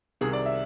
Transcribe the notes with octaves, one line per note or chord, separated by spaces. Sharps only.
C2 C3 D#3 G#4
D5
E5